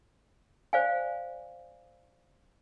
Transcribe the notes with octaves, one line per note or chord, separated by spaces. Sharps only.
C5 D5 F5 G#5